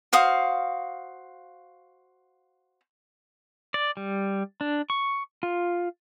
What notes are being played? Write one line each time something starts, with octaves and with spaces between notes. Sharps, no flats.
F#4 C5 F5 D#6
D5
G3
D4
C#6
F4